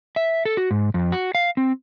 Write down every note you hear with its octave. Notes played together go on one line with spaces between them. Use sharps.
E5
A4
F#4
G#2
F2
F#4
F5
C4